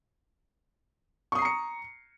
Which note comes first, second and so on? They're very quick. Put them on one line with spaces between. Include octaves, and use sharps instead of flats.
C#6 D#6 C7 A#5 C#7